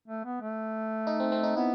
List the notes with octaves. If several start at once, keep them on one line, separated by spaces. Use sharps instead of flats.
A3
B3
A3
D#4
C4
C4
D#4
B3 E4